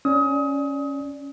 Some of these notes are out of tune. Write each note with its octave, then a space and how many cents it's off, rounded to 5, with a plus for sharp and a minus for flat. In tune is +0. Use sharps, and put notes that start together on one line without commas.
C#4 +0 D5 +0 D#6 +30